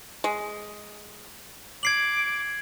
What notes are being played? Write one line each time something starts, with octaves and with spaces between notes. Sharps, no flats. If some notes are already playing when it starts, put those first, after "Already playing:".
G#3
D6 G#6 C7 F#7